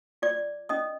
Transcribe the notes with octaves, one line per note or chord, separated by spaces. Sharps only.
F4 D5 D6
C#4 D#5 D#6